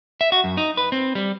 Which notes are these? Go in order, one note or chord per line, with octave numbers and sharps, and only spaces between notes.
E5
F#4
F#2
D#4
B4
C4
G3